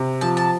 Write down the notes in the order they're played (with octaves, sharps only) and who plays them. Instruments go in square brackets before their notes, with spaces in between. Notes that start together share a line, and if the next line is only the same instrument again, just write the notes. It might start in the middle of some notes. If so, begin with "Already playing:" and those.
Already playing: [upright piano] C3
[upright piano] F3 [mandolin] A5
[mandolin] A5